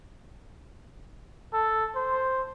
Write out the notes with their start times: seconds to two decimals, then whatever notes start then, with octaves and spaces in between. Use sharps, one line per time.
1.53 A4
1.96 C5